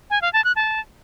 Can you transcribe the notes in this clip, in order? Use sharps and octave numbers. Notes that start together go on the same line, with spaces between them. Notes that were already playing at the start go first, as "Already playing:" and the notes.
G#5
F5
A5
F#6
A5